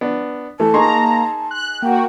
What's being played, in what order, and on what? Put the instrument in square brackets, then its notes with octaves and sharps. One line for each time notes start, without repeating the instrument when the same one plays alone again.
[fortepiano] B3 D4
[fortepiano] E3 [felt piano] A3 [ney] A5
[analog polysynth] A#3 A#5 [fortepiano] D#4 G#4 C#6 [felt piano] C6
[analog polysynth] F#6
[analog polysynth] A#3 F#4 [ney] G5